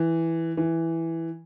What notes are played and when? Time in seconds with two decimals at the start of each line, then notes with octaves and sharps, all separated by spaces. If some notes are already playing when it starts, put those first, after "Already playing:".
Already playing: E3
0.57 E3